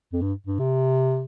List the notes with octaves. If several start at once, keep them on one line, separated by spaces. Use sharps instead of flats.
F2
G2
G2
C3